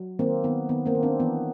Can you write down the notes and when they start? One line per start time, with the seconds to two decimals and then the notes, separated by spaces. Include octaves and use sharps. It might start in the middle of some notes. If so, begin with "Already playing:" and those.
Already playing: F#3
0.19 D#3 A#3 C4
0.44 D#3 B3
0.69 D#3 B3
0.86 A#3 C4
0.95 D#3
1.03 C4 D4
1.20 E3 B3